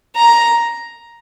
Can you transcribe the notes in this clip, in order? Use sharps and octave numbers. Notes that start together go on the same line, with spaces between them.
A#5